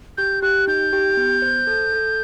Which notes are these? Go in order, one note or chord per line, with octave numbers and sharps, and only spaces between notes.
G4 G6
G4 F#6
D#4 G6
G4
B3
C5
A4
A4